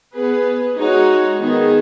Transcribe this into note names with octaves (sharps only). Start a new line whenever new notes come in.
B3 G#4 B4
G#3 D#4 F#4 C#5
D#3 B3 D#4 G#4